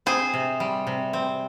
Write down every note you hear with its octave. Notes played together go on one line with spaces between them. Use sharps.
C4 G#4 C5
C3
G3
C3
C4